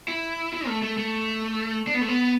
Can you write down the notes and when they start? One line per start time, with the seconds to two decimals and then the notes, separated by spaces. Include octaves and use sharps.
0.08 E4
0.53 E4
0.67 A3
0.82 A3
0.97 A3
1.87 D4
1.94 B3
2.01 A3
2.08 B3